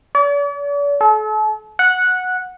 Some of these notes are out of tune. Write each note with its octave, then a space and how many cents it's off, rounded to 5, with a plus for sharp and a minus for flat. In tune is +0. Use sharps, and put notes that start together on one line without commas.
D5 -45
A4 -40
F#5 -10